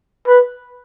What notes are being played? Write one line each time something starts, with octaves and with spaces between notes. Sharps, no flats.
B4